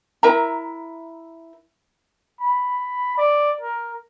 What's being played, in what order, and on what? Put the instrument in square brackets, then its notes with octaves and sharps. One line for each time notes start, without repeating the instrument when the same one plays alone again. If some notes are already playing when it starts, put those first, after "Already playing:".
[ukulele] E4 A#4 E5 A#5
[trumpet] B5
D5
A#4